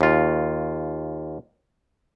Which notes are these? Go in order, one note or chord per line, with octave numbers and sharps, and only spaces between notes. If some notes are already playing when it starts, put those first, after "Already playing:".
D#2 F4